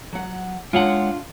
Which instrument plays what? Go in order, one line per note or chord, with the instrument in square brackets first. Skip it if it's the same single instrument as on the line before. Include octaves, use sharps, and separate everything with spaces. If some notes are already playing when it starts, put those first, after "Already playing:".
[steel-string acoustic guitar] F#3 F#5
[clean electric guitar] G#3 C#5 F#5 [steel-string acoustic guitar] D4 F4